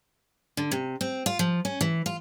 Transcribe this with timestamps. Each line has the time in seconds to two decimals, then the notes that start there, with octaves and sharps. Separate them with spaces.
0.57 D3
0.71 C3
1.01 C4
1.26 F4
1.39 F3
1.65 C#4
1.81 E3
2.06 F4